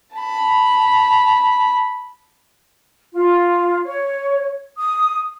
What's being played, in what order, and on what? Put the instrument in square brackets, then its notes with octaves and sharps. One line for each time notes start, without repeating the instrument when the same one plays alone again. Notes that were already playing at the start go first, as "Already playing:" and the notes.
[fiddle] A5 B5
[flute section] F4
C#5
D#6